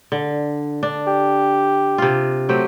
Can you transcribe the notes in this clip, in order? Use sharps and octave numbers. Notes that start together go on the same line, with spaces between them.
D3
D4
G4
C3 F4
F#3 A3 C4 G4